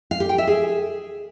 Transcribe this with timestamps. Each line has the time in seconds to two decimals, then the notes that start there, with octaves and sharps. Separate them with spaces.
0.11 F5
0.20 G4
0.29 G5
0.38 E5
0.47 G#4